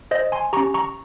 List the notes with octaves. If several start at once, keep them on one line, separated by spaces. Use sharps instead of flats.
C5 D#5
G#5 C6
C#4 G4 A#5 C#6
A#5 C#6